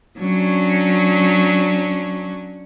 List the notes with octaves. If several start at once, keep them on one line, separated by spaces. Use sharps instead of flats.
F#3 C#4 D4